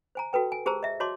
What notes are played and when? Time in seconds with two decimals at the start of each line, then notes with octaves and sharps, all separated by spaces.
0.15 C5 G#5 A#5
0.33 F#4 A4 B4 G5
0.52 G#5
0.66 G4 G#4 C5 A5 A#5 E6
0.83 D#5 E5
1.00 F#4 C#5 D#5 A5 C6 D6